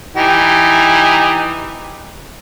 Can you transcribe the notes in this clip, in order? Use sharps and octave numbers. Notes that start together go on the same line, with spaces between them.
E3 D#4 G4